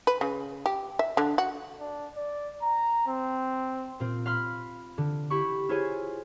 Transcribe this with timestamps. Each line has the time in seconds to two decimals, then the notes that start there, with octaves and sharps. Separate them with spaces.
0.07 B4
0.21 C#3
0.66 G4
0.99 E5
1.17 D3
1.38 F#4
1.80 D4
2.16 D5
2.62 A#5
3.07 C4
4.00 A#2 C4 F4
4.26 F5 B5 C6 F6
4.98 D3
5.30 E4 G4 B5 C#6
5.69 E4 F4 G#4 C5 C#5 G#5